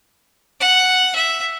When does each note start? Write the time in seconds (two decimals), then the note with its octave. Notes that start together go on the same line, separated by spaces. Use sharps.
0.60 F#5
1.16 E5